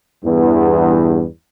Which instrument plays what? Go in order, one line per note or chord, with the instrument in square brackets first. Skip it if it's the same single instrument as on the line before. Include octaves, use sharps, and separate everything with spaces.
[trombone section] E2 G2